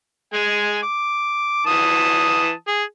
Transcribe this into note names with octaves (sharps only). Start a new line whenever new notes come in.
G#3 G#5
D6
E3 A5 D#6
G#4